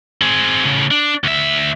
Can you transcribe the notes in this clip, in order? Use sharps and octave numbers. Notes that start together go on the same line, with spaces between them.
C4 G#4
A2 C#3
D4
D2 E5